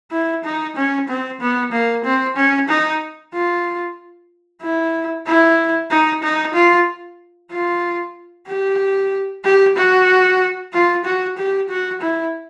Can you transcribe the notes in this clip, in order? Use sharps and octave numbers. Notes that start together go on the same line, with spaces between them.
E4
D#4
C#4
C4
B3
A#3
C4
C#4
D#4
F4
E4
E4
D#4
D#4
F4
F4
G4
G4
F#4
F4
F#4
G4
F#4
E4